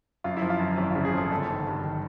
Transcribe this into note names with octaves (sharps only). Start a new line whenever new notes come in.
F#2 F4
E4
F3
F4
F#2
G#1 E4
C#3 F4
G#4
F3 A4
G1 A4
D#3
G2
D#3